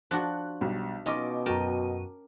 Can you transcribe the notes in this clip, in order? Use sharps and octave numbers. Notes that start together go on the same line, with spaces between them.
F3 D4 F#4 F#6
B1 G3
B2 C#4 D#4 F4 D#5 D6
F#2 F#4 A#4 G5 A5 D#7